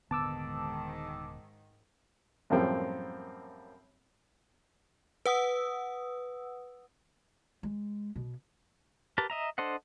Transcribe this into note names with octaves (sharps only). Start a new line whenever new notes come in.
D#1 G#2 D3 D#3 B3 A5 D6 E6
F#2 A2 F3 G3 A#3 C4
B4 F#5 D#6 E6
G#3
B2
G4 A#4 B4 A5
D#5 E5 A#5
D4 A4 C5 D#5 F#5